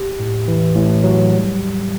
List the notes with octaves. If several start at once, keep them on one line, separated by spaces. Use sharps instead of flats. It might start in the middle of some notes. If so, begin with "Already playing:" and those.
Already playing: G4
A2
E3
A2
F#3
G3
G3